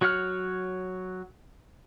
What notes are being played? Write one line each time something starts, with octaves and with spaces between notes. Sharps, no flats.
F#3 F#4 C#5 F#5 F6